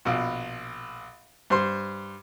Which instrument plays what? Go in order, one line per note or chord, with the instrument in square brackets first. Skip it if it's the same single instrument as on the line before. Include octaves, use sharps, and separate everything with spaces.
[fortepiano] A#1 B2
G2 C5 C6